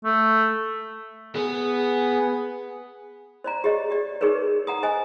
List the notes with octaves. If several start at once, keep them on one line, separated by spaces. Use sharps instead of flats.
A3
B3 G#4
C5 D5 A#5
G4 G#4 C#5 D#5
G4 D5
D#4 G4 G#4 A#4 B4 C#5
F#5 A#5 D#6
C5 D#5 G#5 D#6